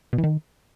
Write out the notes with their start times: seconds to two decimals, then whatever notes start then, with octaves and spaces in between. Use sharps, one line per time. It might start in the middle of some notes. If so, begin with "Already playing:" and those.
0.13 B2
0.18 E3
0.24 D#3